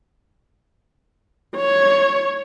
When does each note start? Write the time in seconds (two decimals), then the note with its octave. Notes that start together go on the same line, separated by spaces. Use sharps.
1.56 C#5